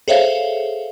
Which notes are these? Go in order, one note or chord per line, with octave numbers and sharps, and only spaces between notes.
G#4 A4 C5 C#5 E5 F5